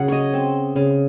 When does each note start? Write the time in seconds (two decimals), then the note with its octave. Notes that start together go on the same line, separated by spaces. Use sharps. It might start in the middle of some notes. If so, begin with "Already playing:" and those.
Already playing: C#3 F#3 F#5
0.08 C#5 D#5
0.34 C4
0.76 C#3